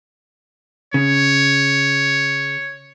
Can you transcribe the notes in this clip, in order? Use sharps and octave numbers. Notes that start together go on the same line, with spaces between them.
C#3 C#5